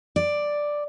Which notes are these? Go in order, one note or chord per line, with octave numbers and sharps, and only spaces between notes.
D5